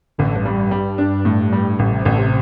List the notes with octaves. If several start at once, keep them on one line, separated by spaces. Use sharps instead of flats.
A1 D3
G2
G3
G2
G3
D4
A2
G3
A1 A2
C3
A1 D3
C3